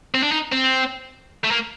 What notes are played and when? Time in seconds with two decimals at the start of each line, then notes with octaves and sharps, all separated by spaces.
0.14 C4
0.23 D4
0.32 D#4
0.52 C4
1.44 A3
1.51 A#3